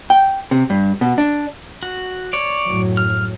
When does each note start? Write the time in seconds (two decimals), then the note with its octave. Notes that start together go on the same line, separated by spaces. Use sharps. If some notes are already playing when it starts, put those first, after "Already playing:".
0.10 G5
0.51 C3
0.70 G2
1.01 B2
1.18 D4
1.83 F#4
2.33 C#5 D5
2.67 F#2 A2 F#3
2.97 F6